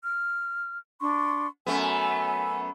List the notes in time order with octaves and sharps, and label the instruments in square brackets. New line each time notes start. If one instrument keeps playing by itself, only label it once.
[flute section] F6
D4 C6 C#6
[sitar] F#2 A3 B3 [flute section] G#5